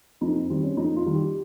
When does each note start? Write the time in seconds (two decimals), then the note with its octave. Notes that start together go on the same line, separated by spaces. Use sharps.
0.21 F2 D#4
0.35 C4
0.49 D#3 G3 C4
0.63 C#4
0.77 F2 D#4
0.96 F4
1.06 D#3 G3
1.15 G4